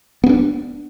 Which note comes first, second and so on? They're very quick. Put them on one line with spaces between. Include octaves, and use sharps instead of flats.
B3 C4 D4